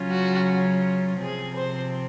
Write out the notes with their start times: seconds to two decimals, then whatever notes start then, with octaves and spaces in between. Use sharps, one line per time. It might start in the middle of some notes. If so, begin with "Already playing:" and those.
Already playing: C#3 F#3 C#4 F4
0.10 F#4
1.19 C3 F3 C4 G#4
1.56 C5